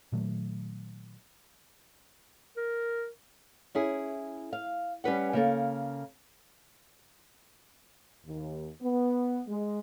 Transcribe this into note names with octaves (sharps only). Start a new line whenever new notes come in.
A#2 D#3 F#3 A3
A#4
C#4 E4 G#4
F5
G3 C#4 B4 F#5
C#3 A#3 A4
D#2
B3
G#3